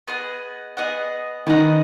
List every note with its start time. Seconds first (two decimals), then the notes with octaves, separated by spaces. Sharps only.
0.08 B3 G#4 D#5 F#5
0.77 B3 G#4 D#5 F#5
1.47 D#3 B3 G#4 D#5 F#5